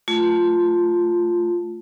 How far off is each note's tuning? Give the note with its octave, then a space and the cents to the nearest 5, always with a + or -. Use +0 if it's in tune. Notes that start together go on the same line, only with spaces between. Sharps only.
A3 +0 F4 +0